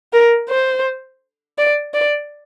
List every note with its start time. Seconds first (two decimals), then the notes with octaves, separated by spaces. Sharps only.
0.13 A#4
0.49 C5
1.58 D5
1.94 D5